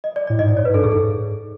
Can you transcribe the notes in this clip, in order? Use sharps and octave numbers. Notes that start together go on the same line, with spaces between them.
D#5
D5
A2 D5
G#2 D#5
D5
C#5
G#2 B4
G2 A4
G#2 G#4
A4